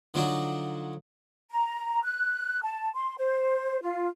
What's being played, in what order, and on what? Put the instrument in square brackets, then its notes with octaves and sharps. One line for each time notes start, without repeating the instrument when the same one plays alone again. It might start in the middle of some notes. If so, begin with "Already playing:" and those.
[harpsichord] D3 F3 F#3 D4 D#4 F#4
[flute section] A#5
F#6
A5
C6
C5
F4